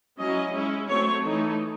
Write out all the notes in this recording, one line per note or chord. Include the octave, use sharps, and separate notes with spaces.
F#3 C#4 E4 D#5
G#3 C#4 E4
F#3 A3 C4 C#5
E3 A3 D#4